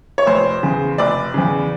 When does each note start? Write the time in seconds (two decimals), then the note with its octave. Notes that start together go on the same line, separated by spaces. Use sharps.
0.18 C#5
0.27 F1 C5
0.63 E2 C#3
0.98 F1 D5
1.34 E2 C#3